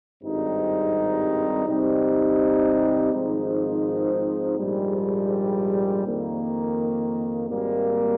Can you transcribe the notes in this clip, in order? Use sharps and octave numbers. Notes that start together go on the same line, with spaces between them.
G#1 G2 G3 C4 D#4
C3 G3 C4 D#4
G#1 G#2 F3 C4 D#4
A#1 G#2 G3
F2 D#3 A#3
G#1 G#2 G3 A#3